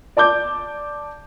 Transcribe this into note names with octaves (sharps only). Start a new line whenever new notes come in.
D5 A5 D6 G6